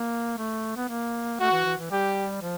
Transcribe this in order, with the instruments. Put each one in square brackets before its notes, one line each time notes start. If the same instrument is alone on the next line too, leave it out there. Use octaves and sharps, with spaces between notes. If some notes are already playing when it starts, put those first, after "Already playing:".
Already playing: [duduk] A#3
A3
B3
A#3
[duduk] A3 [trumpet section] F#4
[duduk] E3
E3
E3
[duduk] G3 [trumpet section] G4
[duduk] F3